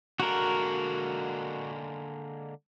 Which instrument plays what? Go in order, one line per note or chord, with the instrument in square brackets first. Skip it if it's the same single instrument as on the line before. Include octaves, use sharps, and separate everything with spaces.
[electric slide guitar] D3 G#3 A#3 [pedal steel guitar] F#4 A#4